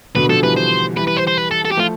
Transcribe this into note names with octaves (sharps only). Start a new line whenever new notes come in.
B2 D3 B4
D3 F3 A4
E3 G3 B4
C5
E3 G3 B4
B4
C5
C5
B4
A4
A4
G4
F3 A3 F4